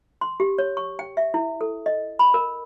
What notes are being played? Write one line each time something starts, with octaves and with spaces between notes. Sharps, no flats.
C6
G4
C#5
C#6
G5
E5
E4
A4
D#5
B5
A#4